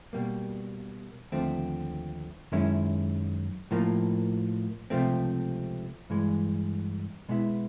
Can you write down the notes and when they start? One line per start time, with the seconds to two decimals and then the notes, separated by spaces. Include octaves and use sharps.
0.13 B2 G3 A#3
1.32 D#2 D3 F3 A3 C4
2.52 F#2 D#3 G#3 C#4 E4
3.71 A2 F3 A#3
4.90 C#2 C3 F3 A3 C4
6.10 G2 E3 G#3
7.29 B2 G#3 B3 E4